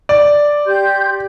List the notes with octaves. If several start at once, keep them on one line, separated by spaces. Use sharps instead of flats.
D5
G4 C6 G6